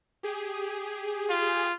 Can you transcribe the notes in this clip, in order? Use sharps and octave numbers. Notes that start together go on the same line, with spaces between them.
G4 G#4
F4